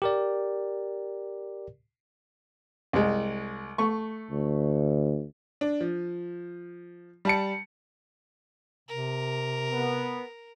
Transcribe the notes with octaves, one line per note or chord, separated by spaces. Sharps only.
G4 A#4 D5
C2 G#3
A3 C#6
D2
D4
F3
G3 A5 C#7
C3 A#4
B3